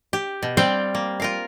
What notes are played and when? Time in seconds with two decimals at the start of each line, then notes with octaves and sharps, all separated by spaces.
0.13 G4
0.42 B2
0.57 G3 C4 D5 F5 G5
0.95 A#3
1.20 F4 A#4 F5